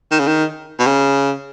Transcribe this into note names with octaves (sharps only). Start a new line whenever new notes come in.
D#3
C#3
D#3
B2
C#3